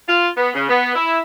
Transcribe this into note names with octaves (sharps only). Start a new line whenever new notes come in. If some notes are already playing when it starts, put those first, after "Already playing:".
F4
B3
C#3
B3
E4